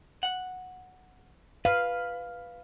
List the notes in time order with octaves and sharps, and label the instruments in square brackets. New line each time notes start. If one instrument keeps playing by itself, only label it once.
[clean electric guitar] F#5
[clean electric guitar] B4 [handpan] F5